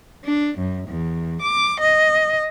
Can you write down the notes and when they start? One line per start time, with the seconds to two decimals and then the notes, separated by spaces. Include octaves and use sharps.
0.24 D4
0.57 F#2
0.87 E2
1.41 D6
1.80 D#5